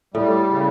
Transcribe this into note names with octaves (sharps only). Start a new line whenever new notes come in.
A2 G3
C#3